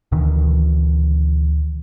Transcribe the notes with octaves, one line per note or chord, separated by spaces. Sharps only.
D2 B2 D#3 E3